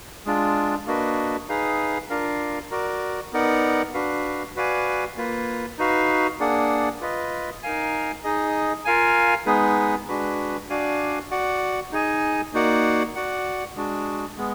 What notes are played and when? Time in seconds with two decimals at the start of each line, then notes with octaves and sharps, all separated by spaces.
0.26 G#3 D4 F4
0.87 A#3 D4 F#4 B4 D#5
1.49 D#4 G#4 B4 F5
2.10 D4 F4 A#4 F5
2.71 F#4 A#4 D5
3.33 B3 D#4 A#4 D5 F#5
3.94 D4 F#4 B4 F5
4.56 F#4 B4 D5 F5 G#5
5.17 A#3 F4 B4
5.78 D#4 F#4 B4 F5
6.40 A#3 D4 G#4 D5 F#5
7.01 F4 B4 D#5
7.63 D#4 A#4 F5 G#5
8.24 D#4 G#4 D#5
8.85 F4 A#4 F5 G#5
9.46 G#3 B3 D#4 G#4 B4
10.08 G#3 D4 F#4 B4
10.70 D4 F#4 D5 F5 G#5
11.31 F#4 D5 F#5
11.92 D#4 G#4 D#5 G#5
12.54 A#3 D#4 F#4 D5 F#5
13.15 F#4 D5 F#5
13.76 G#3 D4 F#4
14.38 G#3 B3